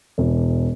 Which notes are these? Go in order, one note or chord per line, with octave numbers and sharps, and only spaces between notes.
E1